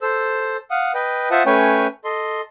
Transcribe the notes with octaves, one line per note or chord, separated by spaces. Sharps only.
A4 C5 E6
F5 F#5 D#6
B4 D#5 G5
F4 C5 E5 F#5 A5 D#6
A3 C#4 B4 C#5 G5 G#5
A4 D#5 C6